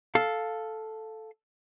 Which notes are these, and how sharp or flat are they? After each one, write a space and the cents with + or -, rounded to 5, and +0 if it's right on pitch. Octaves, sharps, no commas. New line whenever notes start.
A4 +0 F5 +5